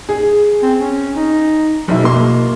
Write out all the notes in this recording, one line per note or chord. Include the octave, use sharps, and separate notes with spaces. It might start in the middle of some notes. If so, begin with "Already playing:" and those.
G#4
C4
C#4
D#4
F#1 B2 E4
A#3 C6